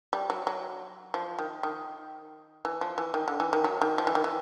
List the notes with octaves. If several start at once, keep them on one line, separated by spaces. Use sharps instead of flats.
G3
F#3
F#3
F3
D#3
D#3
E3
F3
E3
D#3
D3
E3
D#3
F#3
D#3
F3
E3
D#3
E3